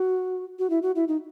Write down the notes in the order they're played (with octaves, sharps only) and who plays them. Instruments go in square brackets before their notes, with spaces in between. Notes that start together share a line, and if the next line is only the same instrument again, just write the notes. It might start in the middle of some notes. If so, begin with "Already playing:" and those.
Already playing: [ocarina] F#4
F#4
E4
F#4
E4
D#4